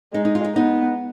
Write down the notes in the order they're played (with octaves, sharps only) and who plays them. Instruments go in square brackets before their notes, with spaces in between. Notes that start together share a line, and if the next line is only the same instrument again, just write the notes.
[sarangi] G#3 [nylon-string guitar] D#4
[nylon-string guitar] D#4
F4
D#4
[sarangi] B3 [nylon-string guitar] D#4